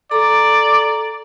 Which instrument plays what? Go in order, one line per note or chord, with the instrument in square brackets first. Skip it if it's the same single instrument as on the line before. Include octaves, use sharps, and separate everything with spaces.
[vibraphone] A4 A#5 [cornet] D5